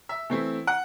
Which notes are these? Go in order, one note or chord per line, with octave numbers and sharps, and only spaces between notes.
E5
E3 A3 C4 E4
F#5